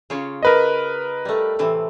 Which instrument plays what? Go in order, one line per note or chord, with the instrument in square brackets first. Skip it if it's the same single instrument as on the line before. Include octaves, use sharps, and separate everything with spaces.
[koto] C#3 F4 C#5
[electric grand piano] A#4 B4 D#5
[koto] G3 A3
A2 C3 E3